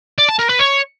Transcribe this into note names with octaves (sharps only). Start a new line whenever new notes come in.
D5
A5
A#4
B4
C#5